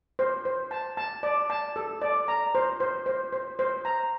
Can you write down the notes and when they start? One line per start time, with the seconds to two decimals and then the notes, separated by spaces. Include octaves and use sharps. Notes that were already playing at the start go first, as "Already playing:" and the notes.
0.19 C5
0.45 C5
0.71 A5
0.97 A5
1.23 D5
1.50 A5
1.76 A4
2.02 D5
2.28 A#5
2.55 C5
2.80 C5
3.06 C5
3.33 C5
3.59 C5
3.85 A#5